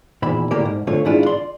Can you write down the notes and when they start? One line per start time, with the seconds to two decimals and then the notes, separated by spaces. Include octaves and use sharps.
0.22 E2 A#2 D#3 E5 B5
0.51 A2 D3 A#3 G4 A#4 D5
0.65 G#2
0.87 D2 D3 A3 F4 C#5
1.05 G#2 D#3 D4 E4 F4
1.26 D5 C6